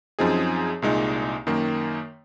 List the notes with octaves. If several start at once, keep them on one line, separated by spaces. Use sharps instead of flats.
F#2 F3 C4 D#4 G#4
C2 A#2 G#3 D#4
F#2 D#3 A#3